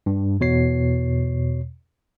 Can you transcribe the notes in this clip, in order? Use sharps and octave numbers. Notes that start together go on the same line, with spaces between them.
G2
E2 B2 C#5 C7